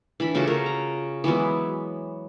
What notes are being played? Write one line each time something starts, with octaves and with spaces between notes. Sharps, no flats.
E3 D4 B5
C#3 A3 F4 F#4
A#4
A#5
E3 F#3 G#3 B3